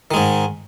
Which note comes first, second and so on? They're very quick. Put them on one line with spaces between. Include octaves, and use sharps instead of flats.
D#3 G#3 G#2